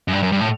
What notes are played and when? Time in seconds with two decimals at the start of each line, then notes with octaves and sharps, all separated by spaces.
0.08 F#2
0.13 G2
0.22 F#2
0.32 G2
0.41 A2